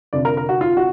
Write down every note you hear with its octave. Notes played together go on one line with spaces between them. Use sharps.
F1 F2 D3 D5
A#4
A#4
F#4
F4
F#4